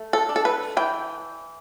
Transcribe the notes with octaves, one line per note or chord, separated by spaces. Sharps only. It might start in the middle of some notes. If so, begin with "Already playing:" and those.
Already playing: A3
A4
D4
A4
B4
E3 G5